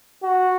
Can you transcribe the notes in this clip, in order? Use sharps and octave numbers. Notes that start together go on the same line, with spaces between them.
F#4